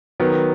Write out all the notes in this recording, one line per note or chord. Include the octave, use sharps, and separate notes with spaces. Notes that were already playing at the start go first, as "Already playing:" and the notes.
D#3 F#3 B3